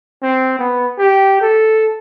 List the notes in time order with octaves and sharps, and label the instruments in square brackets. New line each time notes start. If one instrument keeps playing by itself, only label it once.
[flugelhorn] C4
B3
G4
A4